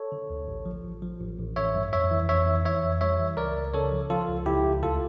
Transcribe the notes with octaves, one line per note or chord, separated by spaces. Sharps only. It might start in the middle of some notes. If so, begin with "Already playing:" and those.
Already playing: A4 C#5
D3
D2
A1
F3
A1
F3
A1
A1
A1 C#5 E5
G2
F2 C#5 E5
E3
F2 C#5 E5
E3
E3 C#5 E5
F2
G3 C#5 E5
E3
C#2 A#4 D5
C#2
C#3 A4 C#5
F3
F3 F4 A4
C#2
C#2 E4 G4
C#2
D2 F4 A4